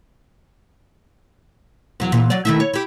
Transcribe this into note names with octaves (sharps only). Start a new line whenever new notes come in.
E2 F#3
A#2 E3
F#3 D5
D#3 A3 E4
C#5
E4 G4